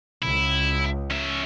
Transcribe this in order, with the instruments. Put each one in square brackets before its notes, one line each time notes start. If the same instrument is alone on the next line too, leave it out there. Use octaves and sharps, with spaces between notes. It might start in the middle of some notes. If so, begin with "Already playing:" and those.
[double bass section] C#2 [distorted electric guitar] E4
[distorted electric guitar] C#4 E5